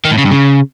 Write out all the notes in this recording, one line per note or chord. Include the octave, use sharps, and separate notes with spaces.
D#3
A2
C#3
G2
C#3